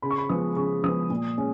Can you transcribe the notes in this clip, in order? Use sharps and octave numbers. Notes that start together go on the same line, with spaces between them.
C#3 B5
C#6
B5
F3 G#3 B3 D#6
C#3 C#6
F3 G#3 B3 D#6
A#2
G#3 C#4